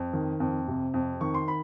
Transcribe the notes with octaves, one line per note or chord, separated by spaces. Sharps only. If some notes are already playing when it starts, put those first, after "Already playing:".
Already playing: F2
D#3
F2
C3
F2
D#3 C#6
C6
B5